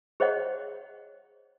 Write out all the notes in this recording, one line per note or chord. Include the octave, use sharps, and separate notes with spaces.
G#4 C5 C#5 D#5 F#5